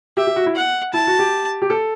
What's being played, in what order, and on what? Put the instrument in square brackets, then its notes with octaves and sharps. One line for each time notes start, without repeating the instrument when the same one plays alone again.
[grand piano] G4 [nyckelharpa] E5
[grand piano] G4
F#4
E4
[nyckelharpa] F#5
[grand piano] E4 [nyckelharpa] A5
[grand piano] F#4
G4
G4
A4